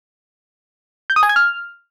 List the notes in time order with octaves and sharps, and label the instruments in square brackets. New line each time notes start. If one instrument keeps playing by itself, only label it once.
[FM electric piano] G6
D#6
G#5
G#6
F6